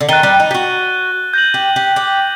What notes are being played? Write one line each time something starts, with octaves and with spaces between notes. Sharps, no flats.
D3
D#3 F#6 A6 D#7 G7
G3
D#4
G4
F#4
G6 A#6 F#7
G4
G4
G4